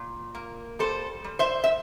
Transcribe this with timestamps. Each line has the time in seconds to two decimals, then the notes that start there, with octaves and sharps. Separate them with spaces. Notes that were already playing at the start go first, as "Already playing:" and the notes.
Already playing: A#2
0.35 A#3
0.79 G3 A4 C5
1.24 G3
1.39 C5 E5
1.64 E5